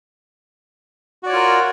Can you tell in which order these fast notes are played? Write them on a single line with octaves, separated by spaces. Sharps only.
F#4 D5 C#5 F4 A#4